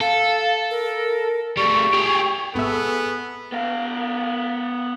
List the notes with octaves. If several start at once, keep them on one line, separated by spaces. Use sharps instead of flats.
A4 F5
A#4
G3 A3 C#6
G4 G#4
G#1 B2 B3 G#4 A4 E5
B3 F5